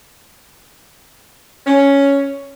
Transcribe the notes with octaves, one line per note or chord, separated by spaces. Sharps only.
C#4